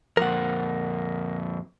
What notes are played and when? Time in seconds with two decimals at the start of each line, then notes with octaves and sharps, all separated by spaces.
0.17 F2 A#2 A#4 F#5